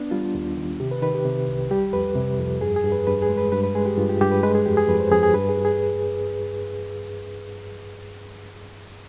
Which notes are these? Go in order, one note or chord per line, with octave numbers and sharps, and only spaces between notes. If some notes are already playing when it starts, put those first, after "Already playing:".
Already playing: B3 D4
G3 F4
D#2
D#3
C3 G4
B4
D#3 B4
G4
C3
C2
G3 G4
F2 B4
C3
F2
G2 G#4
G#4
G2
B4
G2 B4
G#4
G#3
B4
G2 B4
B4
G#3 G#4
G4
G2 F4
G4
G2 G4
B4
G#3 B4
G#4
F2 G4
G#4
F2 B4
C5
F2 G#4
G#4
G2 B4
G#4
G2
G#4